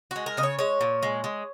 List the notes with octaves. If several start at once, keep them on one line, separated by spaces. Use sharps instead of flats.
G#3 F#4
A#4
C#3 D#5
C#5
G#3 C#5
A#2
G#3
G#3